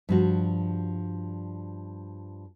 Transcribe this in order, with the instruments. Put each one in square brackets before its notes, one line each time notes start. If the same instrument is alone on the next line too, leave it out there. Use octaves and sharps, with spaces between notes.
[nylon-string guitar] G2 F3 F#4